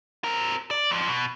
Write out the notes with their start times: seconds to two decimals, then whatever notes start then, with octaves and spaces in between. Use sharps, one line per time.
0.24 C4 A#4
0.71 D5
0.91 F2 F3
1.09 B2